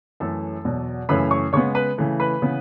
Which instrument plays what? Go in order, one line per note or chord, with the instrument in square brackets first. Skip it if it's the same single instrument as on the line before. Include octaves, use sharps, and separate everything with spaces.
[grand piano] F#2 E3 A3 C#4 A4 A5
E2 B2 F#3
F#2 C#3 E3 A3 C#4 B4 B5
C#5 C#6
C#3 G#3 B3 C#5 C#6
B4 B5
C#3 E3 A3
B4 B5
C#3 E3 B3